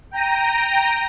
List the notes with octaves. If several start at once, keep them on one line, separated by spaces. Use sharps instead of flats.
G5 A#5 A#6 D#7